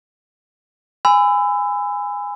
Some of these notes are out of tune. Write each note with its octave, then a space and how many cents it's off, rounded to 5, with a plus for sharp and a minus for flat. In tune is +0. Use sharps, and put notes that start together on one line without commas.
G#5 -15 B5 +30 E6 +10